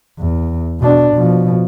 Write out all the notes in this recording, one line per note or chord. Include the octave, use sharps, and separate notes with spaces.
E2
B2 D4
B2 F3